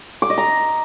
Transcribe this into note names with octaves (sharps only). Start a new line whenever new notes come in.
D6
D#5
A#5